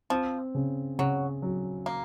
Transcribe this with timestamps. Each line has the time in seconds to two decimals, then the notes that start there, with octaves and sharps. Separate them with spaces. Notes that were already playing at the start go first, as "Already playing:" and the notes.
0.10 F3 C4
0.55 C#3
0.99 C#3 F#3
1.42 F#3
1.86 A#3